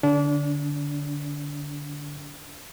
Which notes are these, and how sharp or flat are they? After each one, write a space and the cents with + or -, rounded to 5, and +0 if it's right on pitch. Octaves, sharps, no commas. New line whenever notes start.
D3 +0 D4 -30